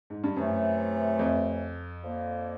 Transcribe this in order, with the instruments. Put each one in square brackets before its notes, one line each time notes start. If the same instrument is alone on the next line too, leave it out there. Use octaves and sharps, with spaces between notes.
[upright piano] G#2
G2
[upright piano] F#2 [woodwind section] C3 E3 A3 C#4
[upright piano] F2
[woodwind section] D3 F3 A#3